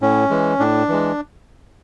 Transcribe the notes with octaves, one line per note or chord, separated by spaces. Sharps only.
A2 C#4
E3 G#3
A2 D4
E3 G#3